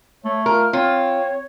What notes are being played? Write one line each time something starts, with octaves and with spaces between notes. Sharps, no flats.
A3 C#5
F4 A#4
C4 F4 C#5